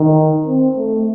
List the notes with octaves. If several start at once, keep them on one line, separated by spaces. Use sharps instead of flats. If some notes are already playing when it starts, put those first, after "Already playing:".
Already playing: D#3
C4
A3